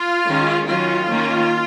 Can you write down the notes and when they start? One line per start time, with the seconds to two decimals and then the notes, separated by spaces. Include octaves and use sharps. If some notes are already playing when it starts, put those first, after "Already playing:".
Already playing: F4
0.27 D#3 G#3 C#4
0.67 D#3 F#3 C#4 F4
1.08 D#3 A#3 C#4